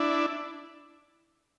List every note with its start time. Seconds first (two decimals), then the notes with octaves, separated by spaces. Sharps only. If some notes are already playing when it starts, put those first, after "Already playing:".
Already playing: D4 E4